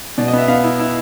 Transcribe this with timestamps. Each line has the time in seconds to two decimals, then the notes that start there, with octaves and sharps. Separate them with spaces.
0.18 B2 D5
0.28 D#5
0.33 B3 E5
0.48 B3 F5
0.64 E4
0.80 E4